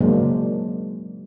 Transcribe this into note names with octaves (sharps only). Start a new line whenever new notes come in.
C#3 F#3 G#3 A#3 D4 C5